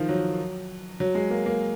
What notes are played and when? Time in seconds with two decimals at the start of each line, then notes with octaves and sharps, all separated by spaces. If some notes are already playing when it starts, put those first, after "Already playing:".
Already playing: D#3 F3
0.09 F#3
1.00 F#3
1.15 G#3
1.30 A#3
1.46 A#3